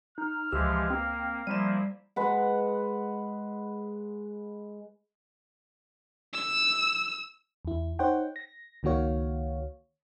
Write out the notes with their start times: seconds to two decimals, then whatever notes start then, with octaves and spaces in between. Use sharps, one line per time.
0.18 D#4 F6
0.52 C#2 E3 F3 G#3 G4 E6
0.90 A#3 C4
1.47 F3 G3 A#3 E4 D#7 E7
2.16 G#3 B4 F#5
6.33 E6
7.65 E2 E4
7.99 D#4 C5 C#5 F#5 G5
8.36 A#6
8.83 C#2 D#3 A#3 F#4 C#5 F5